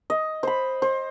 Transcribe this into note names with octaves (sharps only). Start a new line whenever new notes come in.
D#5
C5 B5
C5